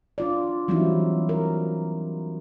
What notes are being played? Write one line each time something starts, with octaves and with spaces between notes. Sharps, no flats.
D4 F4 D5
E3 F#3 G3 C4 D#4 E4
A#4